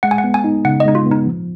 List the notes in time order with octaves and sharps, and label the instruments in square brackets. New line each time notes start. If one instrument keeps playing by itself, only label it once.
[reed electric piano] G#3 [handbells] F#5
[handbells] G#5
F#5
[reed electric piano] B3
[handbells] G#5
[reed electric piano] D#4
[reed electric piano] C#3 [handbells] F#5
[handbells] D#5
[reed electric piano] G#3 [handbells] D#4
[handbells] F4
[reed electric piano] B3
[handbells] D#4
[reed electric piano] F3